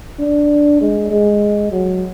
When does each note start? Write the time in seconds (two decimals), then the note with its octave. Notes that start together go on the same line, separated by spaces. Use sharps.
0.19 D4
0.81 G#3
1.11 G#3
1.72 F#3